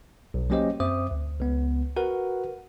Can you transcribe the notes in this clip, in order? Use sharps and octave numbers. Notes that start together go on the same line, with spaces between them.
B1
F#3 A#3 C#4 G4 C5 D#5
F#2 C4 C5 E5 D6 D#6
D2
C#2 B3
F#4 A#4 B4 F#5